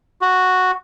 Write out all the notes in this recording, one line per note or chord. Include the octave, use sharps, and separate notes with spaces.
F#4